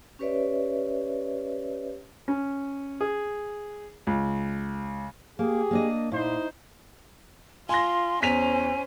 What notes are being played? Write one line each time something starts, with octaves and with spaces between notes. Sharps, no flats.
C#4 G4 B4 C#5 D5 E5
C#4
G#4
C#2
A#3 G4 G#4
A#3 D4 D#5
A#2 D#4 E4 C5
F4 G#5 C6 A#6
E2 C#4 C5 G#5 B6 F7